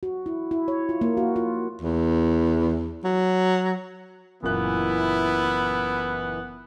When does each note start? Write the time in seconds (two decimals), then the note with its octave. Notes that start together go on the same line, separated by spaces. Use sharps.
0.03 F#4
0.26 E4
0.51 E4
0.68 C#5
0.89 F4
1.01 A#3
1.17 F#4
1.36 F4
1.81 E2
3.04 F#3
4.43 F#1 A#2 E3 B3 E4 F#6